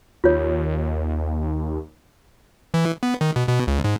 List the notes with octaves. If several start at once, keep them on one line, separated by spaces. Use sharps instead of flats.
D#2 F4 C#5
E3
B3
D#3
B2
B2
C#2
G#2